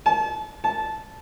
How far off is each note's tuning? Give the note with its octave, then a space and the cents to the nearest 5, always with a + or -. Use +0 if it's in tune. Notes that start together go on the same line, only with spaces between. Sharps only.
A5 -35
A5 -15